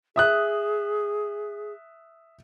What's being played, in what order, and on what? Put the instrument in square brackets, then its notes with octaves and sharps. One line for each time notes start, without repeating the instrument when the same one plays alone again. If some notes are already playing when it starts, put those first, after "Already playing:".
[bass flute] G#4 [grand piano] E5 D#6 F#6